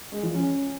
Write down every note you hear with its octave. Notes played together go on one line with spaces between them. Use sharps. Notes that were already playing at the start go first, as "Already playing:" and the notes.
G#3
F3
C#4